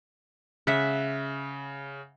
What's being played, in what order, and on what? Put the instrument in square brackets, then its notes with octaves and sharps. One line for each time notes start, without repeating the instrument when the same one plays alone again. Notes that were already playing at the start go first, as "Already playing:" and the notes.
[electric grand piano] C#3 [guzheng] E5 F#5